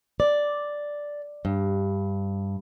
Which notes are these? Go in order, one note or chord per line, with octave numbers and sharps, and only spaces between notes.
D5
G2